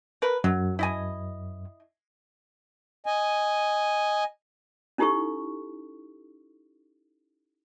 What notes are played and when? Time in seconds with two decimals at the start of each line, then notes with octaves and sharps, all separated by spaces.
0.22 A#4 B4
0.44 F#2 F#3
0.79 E4 D#5 G#5
3.06 D#5 G#5
4.98 C#4 D#4 E4 G4 A4 C#6